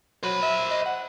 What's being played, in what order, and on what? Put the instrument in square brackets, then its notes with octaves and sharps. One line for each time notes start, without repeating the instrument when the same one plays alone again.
[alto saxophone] F#3 [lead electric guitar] C5 B5
[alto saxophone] E5
D#5
F#5